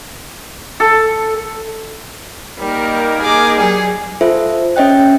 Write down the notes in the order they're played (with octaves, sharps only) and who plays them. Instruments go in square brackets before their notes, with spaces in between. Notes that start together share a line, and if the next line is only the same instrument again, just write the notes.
[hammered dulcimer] A4
[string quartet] G3 [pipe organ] A#3 D#4 A#4
[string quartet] G#4 D6
F#3 G3 G#4
[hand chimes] F4 A4 C5 E5
C#4 C#5 D#5 E5 G5 F#6